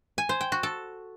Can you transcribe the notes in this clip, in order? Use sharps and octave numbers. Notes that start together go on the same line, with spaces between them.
G#5
C5
G5
F#4
A4